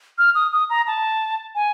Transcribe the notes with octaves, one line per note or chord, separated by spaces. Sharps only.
F6
D#6
D#6
A#5
A5
G#5